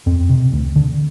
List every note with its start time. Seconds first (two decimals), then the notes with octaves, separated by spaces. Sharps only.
0.06 F2 C4
0.29 C3
0.52 D2
0.76 D3